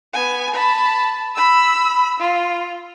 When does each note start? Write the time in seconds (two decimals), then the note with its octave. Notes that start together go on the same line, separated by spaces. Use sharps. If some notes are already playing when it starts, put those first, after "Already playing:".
0.13 B3 G#5
0.54 A5 B5
1.35 B5 E6
2.20 F4